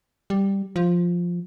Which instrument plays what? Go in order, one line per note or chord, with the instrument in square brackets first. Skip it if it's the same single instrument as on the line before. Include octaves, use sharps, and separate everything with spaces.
[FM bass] G3
F3